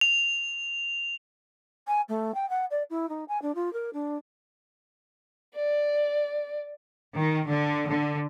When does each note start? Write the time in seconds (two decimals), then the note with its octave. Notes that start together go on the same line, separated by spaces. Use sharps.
0.01 F7
1.87 G#5
2.09 A3
2.34 G5
2.50 F#5
2.71 D5
2.90 E4
3.09 D#4
3.28 G#5
3.42 D4
3.55 F4
3.73 A#4
3.93 D4
5.55 D5
7.16 D#3
7.48 D3
7.88 D3